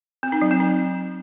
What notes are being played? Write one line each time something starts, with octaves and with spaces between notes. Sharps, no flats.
C4
D#4
F#3
C4
D#4